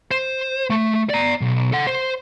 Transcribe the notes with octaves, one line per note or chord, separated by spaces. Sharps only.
C5
A3
D5 A#5
B1
A4 F#5
C5